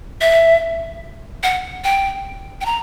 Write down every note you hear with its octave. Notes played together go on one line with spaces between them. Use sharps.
E5
F#5
G5
G5
A#5